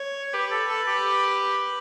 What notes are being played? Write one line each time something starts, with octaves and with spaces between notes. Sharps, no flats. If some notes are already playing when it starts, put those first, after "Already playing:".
Already playing: C#5
G4 B4
A4
A4
G4